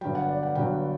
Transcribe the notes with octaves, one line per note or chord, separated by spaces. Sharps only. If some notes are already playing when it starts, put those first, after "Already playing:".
G1 G2 F#3 G5
F#5
D5
F#5
G1 G2 F#3 G5